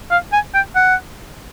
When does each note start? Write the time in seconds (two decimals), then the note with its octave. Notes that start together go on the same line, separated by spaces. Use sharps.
0.11 F5
0.33 G#5
0.54 G5
0.76 F#5